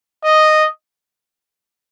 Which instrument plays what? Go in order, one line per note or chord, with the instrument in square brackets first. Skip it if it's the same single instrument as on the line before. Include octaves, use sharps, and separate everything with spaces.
[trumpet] D#5